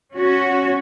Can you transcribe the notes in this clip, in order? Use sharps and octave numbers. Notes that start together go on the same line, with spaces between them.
C#4 F#4